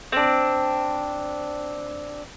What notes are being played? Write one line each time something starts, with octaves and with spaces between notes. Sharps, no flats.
C4 D4